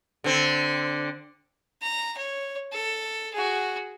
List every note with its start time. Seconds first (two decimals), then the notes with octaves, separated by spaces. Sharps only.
0.24 D3 C4
1.82 A#5
2.17 C#5
2.72 A4
3.34 F#4 G#4